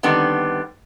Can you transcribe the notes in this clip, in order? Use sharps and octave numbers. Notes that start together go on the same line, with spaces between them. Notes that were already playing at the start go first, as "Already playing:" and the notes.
D3 D#3 G3 B3 C4